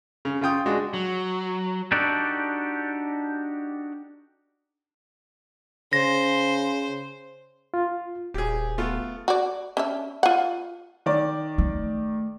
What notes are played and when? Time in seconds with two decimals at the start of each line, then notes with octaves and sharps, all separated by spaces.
0.25 C#3
0.41 C#3 F4 G5 D#6
0.66 G#3 D4 F#4
0.94 F#3
1.92 D4 D#4 F#4 G4 A4 D5
5.93 C#3 C5 A#6
7.74 F4
8.34 D#1 G4 G#4
8.78 A3 B3 F4
9.28 F#4 D5
9.77 C#4 D4 E5
10.23 F4 F#5
11.06 D#3 D5
11.58 A3